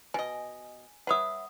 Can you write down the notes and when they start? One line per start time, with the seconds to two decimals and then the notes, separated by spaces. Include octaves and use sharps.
0.14 B2 D#5 G#5
1.07 B4 C#5 E5 F#5 D#6